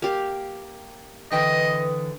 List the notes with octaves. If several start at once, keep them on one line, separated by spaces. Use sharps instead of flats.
A#3 G4 F5
D3 E3 B4 D#5 G5 D#6